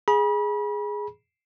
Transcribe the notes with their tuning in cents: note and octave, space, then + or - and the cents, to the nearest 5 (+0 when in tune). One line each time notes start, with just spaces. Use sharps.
G#4 +0 B5 -35